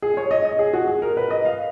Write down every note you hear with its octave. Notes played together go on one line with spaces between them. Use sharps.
G#4
C#5
D#5
D#5
G#4
F#4
G#4
A#4
B4
D#5
F5